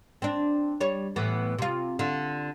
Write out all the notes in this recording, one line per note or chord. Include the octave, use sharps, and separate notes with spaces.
C4 D4
G3 C#5
A2 E3 B3
C3 F4
D3 F4